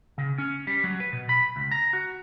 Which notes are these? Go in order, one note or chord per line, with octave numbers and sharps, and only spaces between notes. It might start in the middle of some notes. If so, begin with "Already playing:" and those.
C#3
C#4
G3
F#3
B4
B2
B5
C#2
A#5
F#4